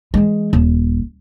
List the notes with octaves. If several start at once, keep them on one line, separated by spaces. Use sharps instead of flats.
E3 G#3
D#1